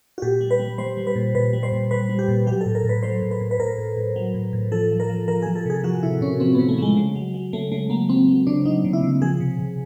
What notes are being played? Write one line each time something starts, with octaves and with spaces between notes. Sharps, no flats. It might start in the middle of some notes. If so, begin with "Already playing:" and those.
F#4
A#2 G4
G3
B4
G3
G3 C5
G3
B4
A#2
A#2 B4
G3
C5
A#2
G3 B4
G3
G4
A#2
F#3 G4
A2 A4
A#4
A2
B4
F#3 C5
A2
B4
A2
B4
A2 A#4
A2
A2
F#3
A2
A2
F3 A4
F3
A#4
F3
F3 A#4
F3 G#4
A4
C3 G#4
F3 F#4
C3 E4
C3 C#4
F3 C4
C3 B3
A3
F3 G#3
C#3
F#3
F#3
C#3 A3
C#3 A3
F#3 A#3
F#3 C4
F#3
C#3 D4
F#3 D#4
C#3
E4
C#3
F3 G#4
C3
C3